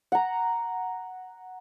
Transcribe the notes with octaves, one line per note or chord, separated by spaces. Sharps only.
F#5 A#5